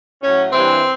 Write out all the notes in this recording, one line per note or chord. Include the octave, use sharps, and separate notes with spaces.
A2 F#3 C#4
G2 E3 C4